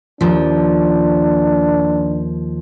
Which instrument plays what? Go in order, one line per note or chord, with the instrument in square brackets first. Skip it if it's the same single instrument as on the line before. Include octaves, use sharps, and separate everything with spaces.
[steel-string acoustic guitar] D#2 F3 [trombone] D4